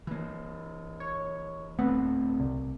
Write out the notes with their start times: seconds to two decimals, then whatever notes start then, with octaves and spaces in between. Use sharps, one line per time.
0.07 E3 A#3
1.00 C#5
1.79 D1 A3 B3 C4
2.39 C2